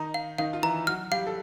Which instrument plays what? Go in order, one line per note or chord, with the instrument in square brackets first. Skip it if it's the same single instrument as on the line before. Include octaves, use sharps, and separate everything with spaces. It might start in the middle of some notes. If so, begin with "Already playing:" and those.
Already playing: [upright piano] D#3 D#4 [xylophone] A#5
[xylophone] F5
[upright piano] D#3 D#4 [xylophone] F5
[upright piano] F4
[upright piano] E3 E4 [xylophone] A#5
[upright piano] F#3 F#4 [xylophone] F6
[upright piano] G3 G4 [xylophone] F5
[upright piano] A4